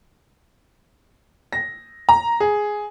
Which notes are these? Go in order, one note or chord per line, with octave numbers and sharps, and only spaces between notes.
A#6
A#5
G#4